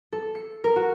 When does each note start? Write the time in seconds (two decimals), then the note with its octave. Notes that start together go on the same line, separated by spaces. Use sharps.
0.12 A4
0.35 C#7
0.64 A#4
0.76 F#4